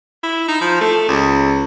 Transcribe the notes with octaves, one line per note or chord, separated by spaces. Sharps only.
E4
D#4
F3
A3
C#2